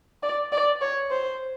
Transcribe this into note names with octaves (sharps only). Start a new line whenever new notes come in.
D5
D5
C#5
C5